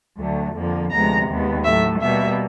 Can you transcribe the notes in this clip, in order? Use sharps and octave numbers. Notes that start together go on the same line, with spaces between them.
D2 D3 F#3 A3
F2 D3 F3 A#3
D2 C3 F3 G#3 B3 A#5
D#2 D#3 G#3 B3
A2 F#3 A3 E5
B2 G3 A#3 E5